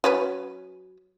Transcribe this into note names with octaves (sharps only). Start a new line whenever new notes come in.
F#3 C#4 B4